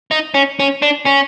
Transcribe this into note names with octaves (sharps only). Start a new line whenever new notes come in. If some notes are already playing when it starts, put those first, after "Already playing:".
D#4
C#4
C#4
D4
C#4